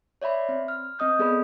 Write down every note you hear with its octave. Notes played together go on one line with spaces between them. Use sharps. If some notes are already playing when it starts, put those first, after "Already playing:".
C#5 D5 E5 B5 C6
C4
F6
C4 D#5 D#6 G6
B3 G#4 A4 B4 D5 B5